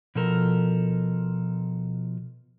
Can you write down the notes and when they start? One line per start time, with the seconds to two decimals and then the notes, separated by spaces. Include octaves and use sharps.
0.15 B2 F3 A4 A#4